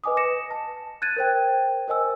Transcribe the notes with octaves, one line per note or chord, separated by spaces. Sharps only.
B4 D#5 G#5 D6 D#6
A#6 C#7 E7
A5
F#6 G#6 A6 D#7
A#4 C5 G5
A#4 C5 D#5 G#5 E6